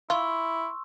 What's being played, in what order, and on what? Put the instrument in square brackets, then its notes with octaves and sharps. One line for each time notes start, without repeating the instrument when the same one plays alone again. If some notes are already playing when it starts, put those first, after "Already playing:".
[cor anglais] E4 [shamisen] F4 [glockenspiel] C6 C#6 E6